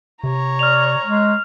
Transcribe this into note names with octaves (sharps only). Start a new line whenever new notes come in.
C3 C#5 A#5
D5 F6 F7
G#3